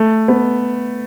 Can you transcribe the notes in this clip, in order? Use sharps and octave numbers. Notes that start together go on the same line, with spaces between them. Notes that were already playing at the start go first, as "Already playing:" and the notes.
Already playing: A3
B3